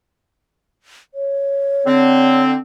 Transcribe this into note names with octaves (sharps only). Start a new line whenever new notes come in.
C#5
D3 C4